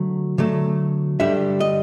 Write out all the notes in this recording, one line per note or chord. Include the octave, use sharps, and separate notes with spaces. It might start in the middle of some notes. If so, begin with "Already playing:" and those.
Already playing: D3 F#3 A3
D3 F#3 A3
G2 D3 G3 E5
D#5